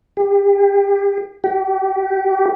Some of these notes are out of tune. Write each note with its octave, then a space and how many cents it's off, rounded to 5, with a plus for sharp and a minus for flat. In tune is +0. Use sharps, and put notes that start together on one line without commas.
G4 +35
G4 -35